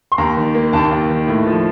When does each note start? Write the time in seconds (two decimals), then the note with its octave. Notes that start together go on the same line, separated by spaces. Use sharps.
0.12 C6
0.18 D#2 A#5
0.37 D#3
0.55 A#3
0.73 D#2 A5
0.91 D#2
1.10 D#3
1.28 A2
1.47 F3